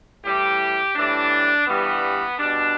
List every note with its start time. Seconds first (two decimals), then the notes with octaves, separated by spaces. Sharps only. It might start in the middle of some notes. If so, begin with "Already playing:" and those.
0.23 A2 E3 G3 G4
0.95 A2 E3 G3 D4
1.67 G2 E3 G3 B3
2.38 B2 G3 D4